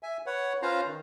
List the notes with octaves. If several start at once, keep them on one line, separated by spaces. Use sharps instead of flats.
E5 G#5
B4 C#5 F#5
C#4 F4 B4 C5 F5 A#5
D#3